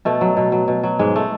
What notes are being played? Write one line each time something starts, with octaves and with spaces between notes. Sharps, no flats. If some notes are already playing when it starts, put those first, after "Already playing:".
B2 A3
F#3
B2
F#3
B2
F#3
G#2 G#3
A3